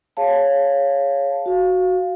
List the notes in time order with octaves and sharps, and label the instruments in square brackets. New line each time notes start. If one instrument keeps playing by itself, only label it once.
[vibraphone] G#4 C#5 F5 A5
F#4 F5